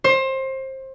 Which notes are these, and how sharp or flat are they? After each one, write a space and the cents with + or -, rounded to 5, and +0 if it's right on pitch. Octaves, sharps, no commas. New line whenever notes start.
C5 +25